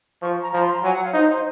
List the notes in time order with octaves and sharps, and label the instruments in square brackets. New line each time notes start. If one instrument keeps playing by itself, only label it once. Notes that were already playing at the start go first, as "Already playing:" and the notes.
[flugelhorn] F3 [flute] C#6
[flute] A#5
[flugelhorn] F3 [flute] A#5
[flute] C6
A#5
[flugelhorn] F#3 [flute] G#5
[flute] F#5
F5
[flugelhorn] D#4 [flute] C5
[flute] C5